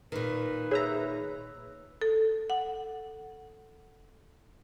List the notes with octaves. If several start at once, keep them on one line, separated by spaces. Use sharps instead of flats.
A#2 D#3 B4
G#4 C#5 E5 A#5 E6
A4
F#5